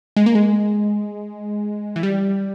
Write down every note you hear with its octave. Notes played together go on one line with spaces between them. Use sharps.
G#3
A#3
G#3
E3
G3